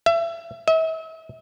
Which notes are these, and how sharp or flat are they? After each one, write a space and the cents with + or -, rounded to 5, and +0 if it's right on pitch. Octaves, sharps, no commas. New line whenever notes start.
E5 +30
E5 -40